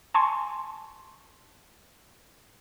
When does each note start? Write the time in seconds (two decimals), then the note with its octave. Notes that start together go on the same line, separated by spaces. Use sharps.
0.14 G#5 A5 C6 C#6